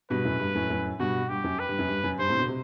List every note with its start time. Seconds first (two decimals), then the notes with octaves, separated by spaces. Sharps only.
0.10 G2 B2 B4
0.25 F#2 A2
0.40 G2
0.55 F#2 A2
0.70 F#2 A2
0.99 G2 B2 F#4
1.29 G2 G4
1.44 F#2
1.59 B4
1.69 G2
1.79 F#2
1.89 G2
2.04 F#2
2.19 G2 C5
2.28 A2 C3
2.38 B2 D3
2.48 C3